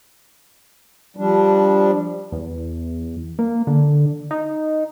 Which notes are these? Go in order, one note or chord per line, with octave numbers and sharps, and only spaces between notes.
F3 G3 D4
E2
A#3
D3
D#4